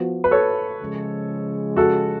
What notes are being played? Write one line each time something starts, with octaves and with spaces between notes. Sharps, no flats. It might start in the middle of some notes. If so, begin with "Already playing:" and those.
Already playing: F3 B3 F#4
B4
A4 C#5
C#3 F3 G#3
F#4 A4